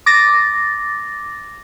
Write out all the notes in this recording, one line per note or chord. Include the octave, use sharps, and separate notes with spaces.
D6 A6 A#6